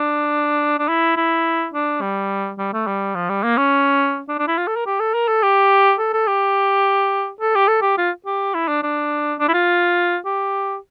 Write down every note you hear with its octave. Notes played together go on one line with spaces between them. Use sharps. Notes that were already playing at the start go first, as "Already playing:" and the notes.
Already playing: D4
D4
E4
E4
D4
G3
G3
A3
G3
F3
G3
A#3
C#4
D4
D4
E4
F4
A4
A#4
G4
A4
A#4
A4
G4
A4
A4
G4
A4
G4
A4
G4
F4
G4
E4
D4
D4
D4
E4
F4
G4